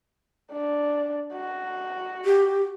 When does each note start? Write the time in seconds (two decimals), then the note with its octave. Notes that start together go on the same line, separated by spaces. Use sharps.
0.52 D4
1.34 F#4
2.25 G4